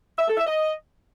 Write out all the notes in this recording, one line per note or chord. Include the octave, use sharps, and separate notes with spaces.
E5
A4
E5
D#5